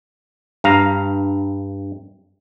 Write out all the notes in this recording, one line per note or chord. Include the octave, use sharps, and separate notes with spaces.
G2 F5 A#5